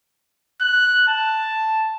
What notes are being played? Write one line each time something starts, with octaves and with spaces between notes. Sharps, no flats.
F#6
A5